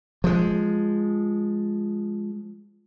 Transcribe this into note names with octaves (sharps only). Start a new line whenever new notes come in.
F3 G#3